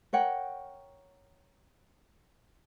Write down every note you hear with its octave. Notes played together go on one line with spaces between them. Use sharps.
A#4 C#5 F#5 G5